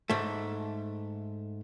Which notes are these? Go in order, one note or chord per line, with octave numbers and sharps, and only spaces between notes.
G#2 A3